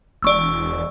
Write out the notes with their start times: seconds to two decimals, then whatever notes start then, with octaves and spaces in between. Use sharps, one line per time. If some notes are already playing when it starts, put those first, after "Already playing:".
0.22 E1 D5 C#6 E6